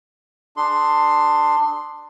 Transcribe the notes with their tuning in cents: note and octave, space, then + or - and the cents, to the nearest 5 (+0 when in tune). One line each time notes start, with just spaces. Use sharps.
D4 +20 G#4 +30 C6 +0